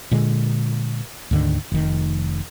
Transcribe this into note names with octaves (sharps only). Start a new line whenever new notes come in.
A#2 D3 G#3
D2 G#2 D3 D#3
F1 D#3